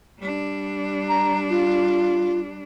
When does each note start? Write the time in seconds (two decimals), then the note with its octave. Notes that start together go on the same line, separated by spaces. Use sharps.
0.18 G3 D4
1.09 A#5
1.50 F4